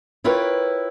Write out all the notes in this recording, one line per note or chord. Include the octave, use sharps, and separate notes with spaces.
E4 F4 A#4 B4 C#5 G5